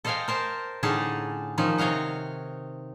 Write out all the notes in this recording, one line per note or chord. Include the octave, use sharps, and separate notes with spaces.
A4 C5 D#5 F5 G5 G#5
A#4 C5 A5
A2 D3 C#4 D#4 G#4 A5
D#3 F3 C#4 D#4
C3 C#5 D#5 F5 F#5